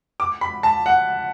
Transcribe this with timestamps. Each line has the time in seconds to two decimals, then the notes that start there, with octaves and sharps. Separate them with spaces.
0.20 D6
0.41 B5
0.63 A5
0.86 F#5